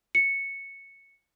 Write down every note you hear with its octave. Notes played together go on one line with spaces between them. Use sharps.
C#7